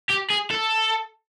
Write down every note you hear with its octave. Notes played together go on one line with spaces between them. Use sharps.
G4
G#4
A4